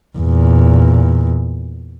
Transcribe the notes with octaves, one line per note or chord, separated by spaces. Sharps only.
E2 A#2